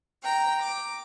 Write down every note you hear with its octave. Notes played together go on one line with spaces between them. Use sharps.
G5 A#5
D6